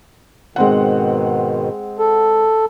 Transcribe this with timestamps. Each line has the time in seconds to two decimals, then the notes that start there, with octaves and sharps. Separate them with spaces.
0.56 G#2 B2 D#3 G#3 C4 F#5
1.99 A4